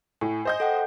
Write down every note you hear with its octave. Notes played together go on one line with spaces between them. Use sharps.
A2 G#5
C5 D#5 G6
A4 F#5 G5